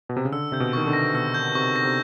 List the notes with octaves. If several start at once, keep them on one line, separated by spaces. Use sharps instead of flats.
B2
C3
C#3
D3 E6
C3 G6
B2
D#3 C#6
D3
A#6
B2 E6
G6
C3 C#6
A#6
C3